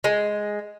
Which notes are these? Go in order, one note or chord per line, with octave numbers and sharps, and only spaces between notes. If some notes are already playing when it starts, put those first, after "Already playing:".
G#3